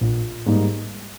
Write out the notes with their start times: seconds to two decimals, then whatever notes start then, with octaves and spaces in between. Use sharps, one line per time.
0.01 A#1
0.46 G#2 G3 A#3 D#4